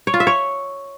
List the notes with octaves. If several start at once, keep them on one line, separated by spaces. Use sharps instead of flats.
C#5
F4
E5
C#5